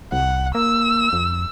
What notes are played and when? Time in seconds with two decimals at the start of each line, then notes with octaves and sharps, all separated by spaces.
0.12 C2 F#5
0.55 A#3 E6
1.13 F2